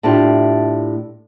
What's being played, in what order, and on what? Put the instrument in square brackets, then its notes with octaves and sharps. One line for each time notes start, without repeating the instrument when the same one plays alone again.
[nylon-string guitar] A2 D4 E4 F4 G4